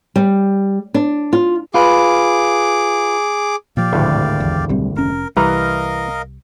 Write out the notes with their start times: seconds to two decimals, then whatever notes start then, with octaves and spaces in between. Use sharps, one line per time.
0.16 G3
0.94 D4
1.33 F4
1.74 F4 G#4 B4 D6
3.77 A#2 F3 G4 D5 F5
3.93 G#1 D2 A2
4.40 A1 E2
4.69 B1 G3 C4
4.96 F1 C#4 A#4
5.37 C2 E3 G3 A#4 B4 D#5 F5 A#5